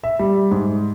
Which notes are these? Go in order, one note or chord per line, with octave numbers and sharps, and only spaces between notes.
E5
G3
G#2